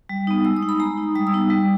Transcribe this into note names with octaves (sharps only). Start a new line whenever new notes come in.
G3
B3 D#4
G#3 E6
D#6
D#4
B5
G#3 A#5
D#4
G3 D#6
E6
B3 D#4
G3